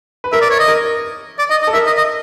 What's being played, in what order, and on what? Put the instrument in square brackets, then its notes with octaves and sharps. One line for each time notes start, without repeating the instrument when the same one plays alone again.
[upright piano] B4
[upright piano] A#4 [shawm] E5
[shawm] D5
C#5
D#5
[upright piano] A#4
[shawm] D5
D#5
D#5
[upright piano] A4
[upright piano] A#4 [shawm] E5
[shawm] D#5
D#5